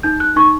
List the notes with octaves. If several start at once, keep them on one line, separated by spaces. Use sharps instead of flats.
D#4 G6
F#6
D#4 C#6